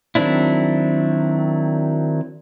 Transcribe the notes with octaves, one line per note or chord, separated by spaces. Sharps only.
D#3 F#3 C4 D4 E4